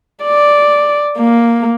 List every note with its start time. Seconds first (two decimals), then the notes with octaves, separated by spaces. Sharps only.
0.24 D5
1.17 A#3